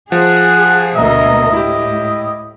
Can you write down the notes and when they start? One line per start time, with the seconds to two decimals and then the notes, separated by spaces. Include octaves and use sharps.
0.12 F3 G#4 F#5
0.96 D2 B2 A#4 D#5 E5 A#5
1.53 A2 E4 G4 D#5